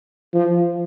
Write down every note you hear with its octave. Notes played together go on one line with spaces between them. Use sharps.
F3